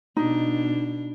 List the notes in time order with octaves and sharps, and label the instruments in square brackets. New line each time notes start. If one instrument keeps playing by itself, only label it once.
[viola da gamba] B2 D4 [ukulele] D#4